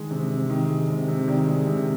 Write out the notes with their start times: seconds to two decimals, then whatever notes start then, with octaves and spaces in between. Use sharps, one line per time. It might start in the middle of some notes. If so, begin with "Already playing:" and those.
Already playing: D#3 G#3
0.11 C3
0.30 C3
0.50 D#3
0.69 G#3
0.88 C3
1.08 C3
1.28 D#3 D5
1.47 G#3
1.67 C3